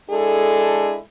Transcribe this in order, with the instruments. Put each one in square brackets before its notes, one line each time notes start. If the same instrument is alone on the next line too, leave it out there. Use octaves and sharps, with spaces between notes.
[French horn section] G#3 D4 E4 G#4 A4